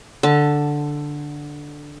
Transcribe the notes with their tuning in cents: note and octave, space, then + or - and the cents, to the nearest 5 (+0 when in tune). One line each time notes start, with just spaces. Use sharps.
D3 +0 A5 -5